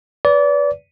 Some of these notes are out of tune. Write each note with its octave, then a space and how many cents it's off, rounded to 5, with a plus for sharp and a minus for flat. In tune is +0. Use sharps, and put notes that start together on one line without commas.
B4 +0 D5 -30